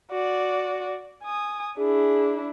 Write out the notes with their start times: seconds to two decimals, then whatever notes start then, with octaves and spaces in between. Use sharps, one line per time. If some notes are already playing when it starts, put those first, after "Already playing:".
0.11 F#4 D5
1.24 G#5 D#6
1.78 D4 E4 G#4